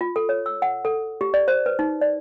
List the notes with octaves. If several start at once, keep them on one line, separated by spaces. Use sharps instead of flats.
F4
A4
C#5
E6
F#5
A4
G4
D5
C5
B4
D#4
D5